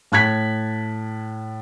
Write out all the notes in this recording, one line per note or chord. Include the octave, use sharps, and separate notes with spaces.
A2 A5 F#6 G#6 B6